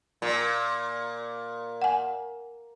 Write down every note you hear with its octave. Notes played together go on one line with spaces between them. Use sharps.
A#2
F#5 G#5